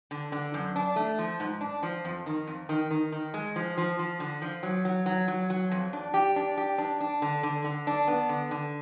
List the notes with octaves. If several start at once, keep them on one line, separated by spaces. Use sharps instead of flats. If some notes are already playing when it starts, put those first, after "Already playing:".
D3
D3
F#2
D4
A3
F3
G#2
D4
F3
F2
D#3
F2
D#3
D#3
D#3
G#3
F3
F3
F3
D3
F3
F#3
F#3
F#3
F#3
F#3
F2
D4
G4
D4
G4
D4
D4
D3
D3
D3
D4
B3
D3
D3